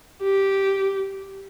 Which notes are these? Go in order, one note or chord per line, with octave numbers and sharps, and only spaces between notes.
G4